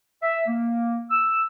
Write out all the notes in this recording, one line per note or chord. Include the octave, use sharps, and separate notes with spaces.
E5
A#3
E6